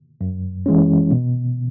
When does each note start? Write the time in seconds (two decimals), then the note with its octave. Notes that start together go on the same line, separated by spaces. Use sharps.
0.21 F#2
0.66 E3 G#3 C#4
1.11 B2